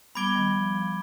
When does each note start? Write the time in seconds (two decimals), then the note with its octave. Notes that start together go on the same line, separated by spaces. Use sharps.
0.15 G3 B3 B5 D6 G#6 D7 G7
0.35 D#3 G3
0.55 F3
0.75 F3